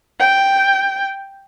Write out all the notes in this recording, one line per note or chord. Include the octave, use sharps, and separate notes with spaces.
G5